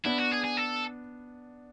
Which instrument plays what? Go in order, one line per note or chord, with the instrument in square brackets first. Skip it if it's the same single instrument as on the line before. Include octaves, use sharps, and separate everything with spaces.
[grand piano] B3 D4 [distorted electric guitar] E4
[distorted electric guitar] F#4
G#4
G#4
A4